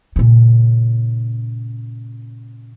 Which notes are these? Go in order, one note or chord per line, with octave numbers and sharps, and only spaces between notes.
A#2 C#3